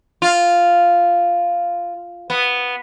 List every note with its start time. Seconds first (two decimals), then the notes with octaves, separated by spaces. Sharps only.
0.22 F4
2.30 B3